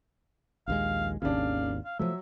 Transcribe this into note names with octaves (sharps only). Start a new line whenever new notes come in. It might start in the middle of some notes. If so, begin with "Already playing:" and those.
A#1 D#2 G#3 F5
G#1 D#2 C#3 D4 F5
F5
F3 F#3 A3 E5